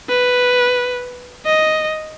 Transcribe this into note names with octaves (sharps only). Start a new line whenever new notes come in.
B4
D#5